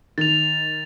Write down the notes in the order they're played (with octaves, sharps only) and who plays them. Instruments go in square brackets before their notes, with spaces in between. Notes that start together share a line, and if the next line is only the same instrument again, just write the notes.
[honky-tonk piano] D#3 [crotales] A6 F7